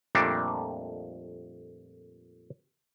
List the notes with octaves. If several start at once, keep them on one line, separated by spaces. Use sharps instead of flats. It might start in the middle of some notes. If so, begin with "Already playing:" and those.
F2 A#2 G3 A3 A#3 D4